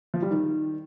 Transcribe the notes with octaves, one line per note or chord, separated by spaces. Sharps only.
F3
G3
D#3